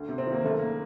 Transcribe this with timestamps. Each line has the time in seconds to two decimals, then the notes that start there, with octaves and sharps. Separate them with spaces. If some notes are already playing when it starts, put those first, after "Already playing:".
Already playing: D2
0.09 C3
0.18 C4
0.27 D#3
0.32 A#3
0.44 F#1 A3
0.59 A#3